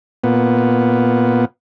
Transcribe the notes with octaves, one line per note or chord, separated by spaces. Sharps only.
A#2 B3